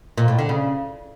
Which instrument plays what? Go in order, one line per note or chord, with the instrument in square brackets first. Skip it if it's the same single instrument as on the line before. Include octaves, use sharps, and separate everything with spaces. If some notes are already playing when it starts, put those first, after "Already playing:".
[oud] A#2
A2
D3
C#3